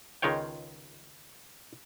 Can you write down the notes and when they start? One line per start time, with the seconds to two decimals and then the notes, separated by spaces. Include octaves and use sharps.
0.22 C#2 D#3 G#3 F4 C#5 G5